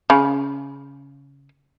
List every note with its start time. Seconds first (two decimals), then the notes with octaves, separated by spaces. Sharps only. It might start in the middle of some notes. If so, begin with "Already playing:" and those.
0.10 C#3